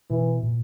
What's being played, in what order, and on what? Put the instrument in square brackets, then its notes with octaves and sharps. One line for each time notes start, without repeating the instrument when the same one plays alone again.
[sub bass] B2 [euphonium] E3
[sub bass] A#2